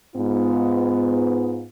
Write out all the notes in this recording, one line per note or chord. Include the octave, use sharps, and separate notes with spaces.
G#2 B3 F4